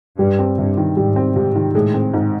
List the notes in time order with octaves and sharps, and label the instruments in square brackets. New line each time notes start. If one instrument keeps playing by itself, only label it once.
[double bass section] G2 [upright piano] G3
[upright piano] C4
[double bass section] G2 [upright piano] C3
[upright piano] D#3
[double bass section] G#2 [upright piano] G3
[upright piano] C4
[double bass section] G#2 [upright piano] C3
[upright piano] D#3
[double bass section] A2 [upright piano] G#3
[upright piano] C4
G#2